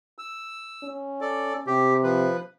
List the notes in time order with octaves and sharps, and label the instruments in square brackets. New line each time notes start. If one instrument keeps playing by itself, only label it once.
[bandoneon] E6
[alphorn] C#4
[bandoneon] A4 D5
[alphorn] C3 [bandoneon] G4
[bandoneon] F3 B4